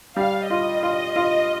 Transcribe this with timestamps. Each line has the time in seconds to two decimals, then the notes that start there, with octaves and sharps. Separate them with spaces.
0.16 G3 F5
0.50 F4 D#5
0.83 F4
1.16 F4